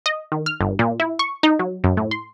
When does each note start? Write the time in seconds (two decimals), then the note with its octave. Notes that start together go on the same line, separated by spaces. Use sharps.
0.06 D#5
0.32 D#3
0.46 F6
0.61 G1
0.79 A#2
1.00 E4
1.19 C#6
1.43 D#4
1.59 F#3
1.84 F#2
1.97 A2
2.11 C6